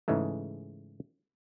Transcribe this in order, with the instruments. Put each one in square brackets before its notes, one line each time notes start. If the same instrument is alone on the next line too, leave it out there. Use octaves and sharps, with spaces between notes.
[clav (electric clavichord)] G#2 C#3 E3 G#3 A3